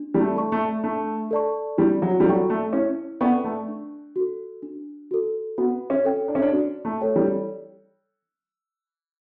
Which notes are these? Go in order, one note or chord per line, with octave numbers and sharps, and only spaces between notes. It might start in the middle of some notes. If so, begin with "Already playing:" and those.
Already playing: D4
G3
A3
A4 D5 A5 C#6
A3
A3 D4
A4 D5 A5 C#6
G3 E4
F#3
G3
F#3 A4 D5 G5 C#6
A3
C#4 E4
B3 A4 D5 G5 C#6
A3
D4
F#4 A4
D4
F#4 A4
B3 F#4
C#4
A4 C#5 G5
D4
C#4
D4
F#4
A3
A4 C#5 G5
G3